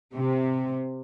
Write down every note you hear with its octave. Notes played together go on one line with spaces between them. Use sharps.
C3